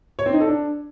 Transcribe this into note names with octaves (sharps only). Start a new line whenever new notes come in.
C#5
C4
D#4
A4
D4